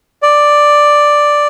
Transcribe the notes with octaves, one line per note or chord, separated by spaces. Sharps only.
D5